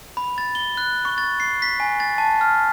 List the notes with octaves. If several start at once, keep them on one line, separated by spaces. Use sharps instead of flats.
B5
A6
G7
F#6
C#6
A6
C7
B6
G#5
A6
A5
F6